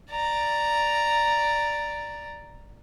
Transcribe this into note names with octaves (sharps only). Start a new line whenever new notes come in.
D5 A#5